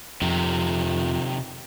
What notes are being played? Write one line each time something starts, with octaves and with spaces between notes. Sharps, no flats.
F2 C3 D#3